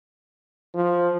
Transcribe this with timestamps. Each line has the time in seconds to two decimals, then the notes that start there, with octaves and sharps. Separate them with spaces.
0.74 F3